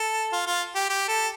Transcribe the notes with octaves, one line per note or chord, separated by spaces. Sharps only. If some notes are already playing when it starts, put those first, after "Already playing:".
Already playing: A4
F4
F4
G4
G4
A4